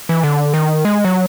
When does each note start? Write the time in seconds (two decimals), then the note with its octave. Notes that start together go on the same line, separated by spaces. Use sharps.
0.09 E3
0.24 D3
0.54 D#3
0.85 G#3
1.05 F#3